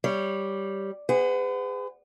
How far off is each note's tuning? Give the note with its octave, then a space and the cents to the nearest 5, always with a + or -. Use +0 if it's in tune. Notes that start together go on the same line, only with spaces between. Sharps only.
G3 +0 C#5 +0
G#4 -30 B4 +45 F#5 +0